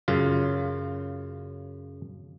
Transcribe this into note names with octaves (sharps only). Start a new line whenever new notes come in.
F#2 C#3 F4